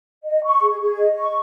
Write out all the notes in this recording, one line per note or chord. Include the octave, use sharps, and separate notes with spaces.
D#5
C#6
G#4
G#4
D#5
C#6